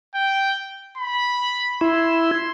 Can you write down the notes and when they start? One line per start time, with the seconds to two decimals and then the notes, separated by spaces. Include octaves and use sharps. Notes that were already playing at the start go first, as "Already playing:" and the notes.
0.15 G5
0.98 B5
1.81 E4 C6